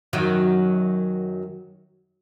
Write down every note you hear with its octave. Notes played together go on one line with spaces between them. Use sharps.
F#2 D#3 F#3